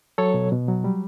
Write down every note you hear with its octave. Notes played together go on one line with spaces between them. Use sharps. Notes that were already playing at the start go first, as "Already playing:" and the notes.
F#3 A4 C#5
B2
B2
F#3
G3